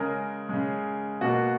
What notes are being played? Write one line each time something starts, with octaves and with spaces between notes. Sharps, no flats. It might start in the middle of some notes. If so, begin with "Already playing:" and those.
Already playing: C#3 G#3 A#4
C#3 G#3
B2 A#3 F#4